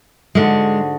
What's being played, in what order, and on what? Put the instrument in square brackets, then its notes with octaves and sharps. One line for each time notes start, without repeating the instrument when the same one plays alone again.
[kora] G#2 D3 F#4 [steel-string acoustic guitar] G#3